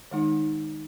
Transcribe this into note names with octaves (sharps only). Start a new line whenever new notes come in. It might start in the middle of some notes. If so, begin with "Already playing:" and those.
D#3 G#3 D#4